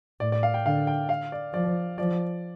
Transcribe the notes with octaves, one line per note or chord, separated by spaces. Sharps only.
A2 D5
D5
F5
G5
D3 F5
G5
F5
D5
F3 D5
F3 D5